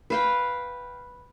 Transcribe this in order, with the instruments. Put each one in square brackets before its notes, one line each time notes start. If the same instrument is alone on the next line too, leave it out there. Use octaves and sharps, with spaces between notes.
[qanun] B4 F5 G5